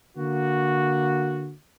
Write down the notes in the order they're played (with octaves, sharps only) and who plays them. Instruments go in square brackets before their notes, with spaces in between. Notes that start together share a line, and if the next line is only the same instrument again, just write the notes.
[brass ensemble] D3 A#3 F#4